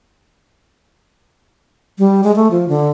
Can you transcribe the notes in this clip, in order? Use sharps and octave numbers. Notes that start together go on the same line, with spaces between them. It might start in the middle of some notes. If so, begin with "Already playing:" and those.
G3
G#3
A3
F3
D3